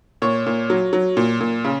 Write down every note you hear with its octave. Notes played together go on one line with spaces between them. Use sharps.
A#2 C#5
A#2
F#3
F#3
A#2
A#2
C#3